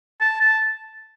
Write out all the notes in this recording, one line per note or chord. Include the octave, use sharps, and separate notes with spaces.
A5
A5